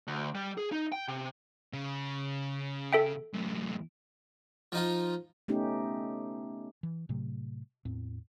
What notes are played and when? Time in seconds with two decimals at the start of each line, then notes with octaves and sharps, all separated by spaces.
0.07 D2
0.35 G3
0.57 G#4
0.72 D#4
0.92 G5
1.08 C3
1.73 C#3
2.93 A4 E5 G5
3.33 F#2 A2
4.72 F3 D#4 F4
5.48 A3 B3 C#4 D#4 G4
6.83 E3
7.09 A2 C3 F#3 A3
7.85 E2 A2 C4